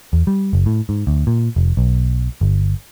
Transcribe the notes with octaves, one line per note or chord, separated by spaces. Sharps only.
E2
G3
F#1
A2
G#2
D2
A#2
F1
B1
G1